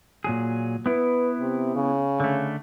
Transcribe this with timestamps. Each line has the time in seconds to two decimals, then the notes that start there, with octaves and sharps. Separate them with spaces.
0.24 A#2 F#3 G#4
0.86 B3 E4 B4
1.40 C3
1.75 C#3
2.20 D3 A3